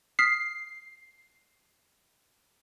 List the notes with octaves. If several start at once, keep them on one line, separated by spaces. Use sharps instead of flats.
D#6 F6 B6 C7